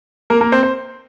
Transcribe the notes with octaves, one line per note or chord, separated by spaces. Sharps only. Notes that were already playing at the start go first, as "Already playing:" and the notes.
A#3 A#4
A#3 A#4
C4 C5
C5